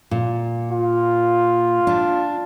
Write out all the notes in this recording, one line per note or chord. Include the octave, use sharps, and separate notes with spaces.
A#2
F4
D4